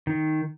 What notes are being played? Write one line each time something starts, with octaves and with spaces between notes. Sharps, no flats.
D#3